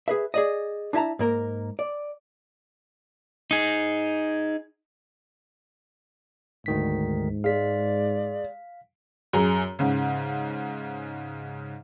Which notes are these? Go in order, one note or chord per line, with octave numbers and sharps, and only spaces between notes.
G#4 B4 E5
G#4 D5 D#5
D4 E4 E5 A5 A#5
G#2 A#3 A#4
D5
D#4 G#4
D2 G#2 D#3 B6
G#3 D5 F5 B6
F#2 G#4 A#5
G#2 C#3